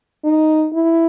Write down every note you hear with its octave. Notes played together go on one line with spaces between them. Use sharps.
D#4
E4